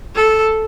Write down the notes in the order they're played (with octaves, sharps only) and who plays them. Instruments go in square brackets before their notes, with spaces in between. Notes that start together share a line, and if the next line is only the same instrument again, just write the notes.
[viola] A4